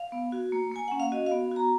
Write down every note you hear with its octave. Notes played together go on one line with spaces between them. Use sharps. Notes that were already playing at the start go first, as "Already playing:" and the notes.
Already playing: F5
B3
F#4
A#3
A#3 G#5
C#4 F#5
F5
F#4 D#5
F5
B3
F#4 A#5